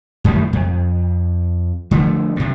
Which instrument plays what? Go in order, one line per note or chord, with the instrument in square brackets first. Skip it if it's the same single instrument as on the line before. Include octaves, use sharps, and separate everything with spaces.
[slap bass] F#2 A2 D#3 G3
F2
D3 F3 A3
G2 C3